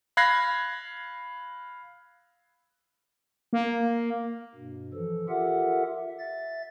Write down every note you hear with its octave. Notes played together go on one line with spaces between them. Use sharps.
F5 B5 F#6 G#6 A#6 C7
A#3
G2 B2
E3 F3 A4
F4 G4 A4 A#4 E5 F#5
E5
E5 A6